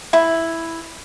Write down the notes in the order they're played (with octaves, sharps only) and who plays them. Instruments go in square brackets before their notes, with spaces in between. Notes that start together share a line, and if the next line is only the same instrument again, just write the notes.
[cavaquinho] E4